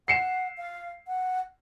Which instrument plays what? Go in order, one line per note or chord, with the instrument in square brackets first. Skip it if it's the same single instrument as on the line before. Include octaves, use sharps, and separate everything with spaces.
[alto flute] F#5 [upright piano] C7 C#7 E7
[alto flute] F5
F#5